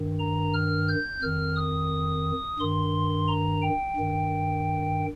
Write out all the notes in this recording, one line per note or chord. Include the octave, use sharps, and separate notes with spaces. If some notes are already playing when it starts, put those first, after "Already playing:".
Already playing: G2 D#3
A#5
F6
G6
F2 D#3 F6
D#6
G2 D#3 C6
A#5
G5
G2 D#3